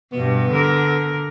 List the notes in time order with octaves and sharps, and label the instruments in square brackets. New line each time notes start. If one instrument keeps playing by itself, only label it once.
[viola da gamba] G2 B2 [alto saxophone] B3
[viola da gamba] D3 A#4